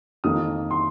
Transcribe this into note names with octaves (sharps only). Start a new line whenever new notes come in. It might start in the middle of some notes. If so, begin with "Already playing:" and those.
F2 D#3 A#3 D#6
C6